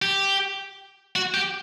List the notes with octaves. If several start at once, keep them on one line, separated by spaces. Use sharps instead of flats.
G4
F#4
G4